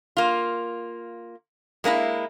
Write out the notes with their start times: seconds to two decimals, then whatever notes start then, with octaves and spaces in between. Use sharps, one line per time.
0.17 A#3 F4
1.84 G#3 A#3 D4 E4